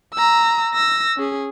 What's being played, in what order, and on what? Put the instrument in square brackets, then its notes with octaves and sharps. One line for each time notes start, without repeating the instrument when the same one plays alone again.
[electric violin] A#5 E6
E6 A#6
C#4 G#4